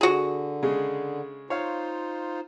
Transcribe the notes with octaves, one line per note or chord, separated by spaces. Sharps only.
D3 F#4 G#4
C#3 G#3
D#4 F4 C5 C#5 F5